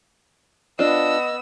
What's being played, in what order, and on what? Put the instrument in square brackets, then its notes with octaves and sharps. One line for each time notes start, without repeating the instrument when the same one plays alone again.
[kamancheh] B3 E6 [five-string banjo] D4 F4 [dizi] D#5